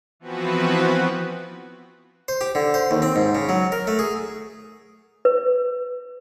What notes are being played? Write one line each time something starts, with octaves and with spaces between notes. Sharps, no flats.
E3 F3 B3 C4 F#4 B4
C5
G4
D3
C5
D#2
C4
G#2
C#3
F#3
A#4
A3
G#4
B4